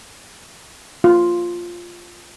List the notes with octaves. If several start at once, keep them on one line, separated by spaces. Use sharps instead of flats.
F4